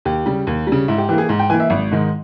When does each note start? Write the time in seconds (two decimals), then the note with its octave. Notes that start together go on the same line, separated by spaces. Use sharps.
0.05 D#2 G4
0.26 C#3 G3
0.47 D#2
0.67 C#3 G3
0.88 G#2 E4
0.98 G4
1.09 E3 A#3 G4
1.18 G#4
1.29 G#2
1.39 G5
1.50 E3 A#3 G#5
1.60 E5
1.70 G#1
1.91 G#2 D#3 G#3